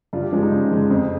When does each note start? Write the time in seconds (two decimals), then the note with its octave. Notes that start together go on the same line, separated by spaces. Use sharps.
0.13 G2 F4
0.23 G4
0.32 F3 G#3 F4
0.42 D#4
0.52 G2 C#4
0.71 F3 G#3
0.90 F2 C4